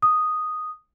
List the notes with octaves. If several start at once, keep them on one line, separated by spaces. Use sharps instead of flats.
D#6